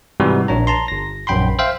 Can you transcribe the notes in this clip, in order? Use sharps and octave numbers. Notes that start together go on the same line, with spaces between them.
G#2 C3 E3 G3 G#3 F#4
A#1 D4 C#5 A#5
A5 A#5 C6
G1 A#6
A#1 F#2 G5 B5 C6
C5 E5 F5 G5